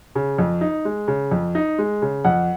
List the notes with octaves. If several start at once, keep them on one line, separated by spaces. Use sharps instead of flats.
C#3
F2
D#4
G#3
C#3
F2
D#4
G#3
C#3
F2 F#5